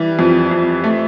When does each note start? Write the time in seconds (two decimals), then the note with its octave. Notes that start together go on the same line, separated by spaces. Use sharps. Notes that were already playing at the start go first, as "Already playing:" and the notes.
Already playing: E3 G3
0.19 F2
0.51 F2
0.84 A3